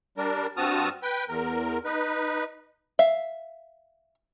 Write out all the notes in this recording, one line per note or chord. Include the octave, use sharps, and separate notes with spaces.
G3 D4 A#4
G2 C4 F#4 A5 D#6 F6
B4 G5
E2 A#4
D#4 B4
E5 F5